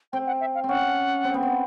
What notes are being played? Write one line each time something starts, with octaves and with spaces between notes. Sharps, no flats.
C4 G5
F#5
E5
F5
C4 C#4 F#5
C4
B3
C4